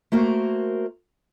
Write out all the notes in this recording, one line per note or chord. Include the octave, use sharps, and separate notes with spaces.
A3 A#3 F#4 A#4 C5